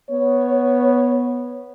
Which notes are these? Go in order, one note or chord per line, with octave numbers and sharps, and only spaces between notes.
B3 C#5